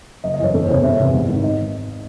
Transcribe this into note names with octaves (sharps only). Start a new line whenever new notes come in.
F#1 D#5
D#5
F#2 E3 C#5
E1 A4
C5
E2 C3 C#5
E1 E5
E2 C3 D#3
G#1
G#2 D#3
D#5